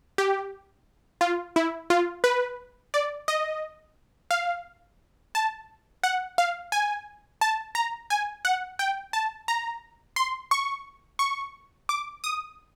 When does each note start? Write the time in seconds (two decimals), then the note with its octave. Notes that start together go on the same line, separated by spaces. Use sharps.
0.18 G4
1.21 F4
1.56 E4
1.90 F4
2.24 B4
2.94 D5
3.28 D#5
4.31 F5
5.35 A5
6.03 F#5
6.38 F5
6.72 G#5
7.41 A5
7.75 A#5
8.10 G#5
8.45 F#5
8.79 G5
9.13 A5
9.48 A#5
10.16 C6
10.51 C#6
11.19 C#6
11.89 D6
12.24 D#6